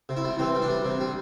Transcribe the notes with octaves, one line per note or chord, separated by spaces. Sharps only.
C3
E4
G3
E3 C4
G3
D4
G3
C3
G3